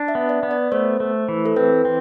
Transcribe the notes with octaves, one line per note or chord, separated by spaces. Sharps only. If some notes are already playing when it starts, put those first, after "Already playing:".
Already playing: D4
E5
B3
D5
B3
D5
A3 C5
A3
E3
A4
C4 B4
C4